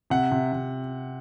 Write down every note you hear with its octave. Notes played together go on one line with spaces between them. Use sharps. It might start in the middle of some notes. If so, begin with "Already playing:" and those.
C3 F#5
C3
C3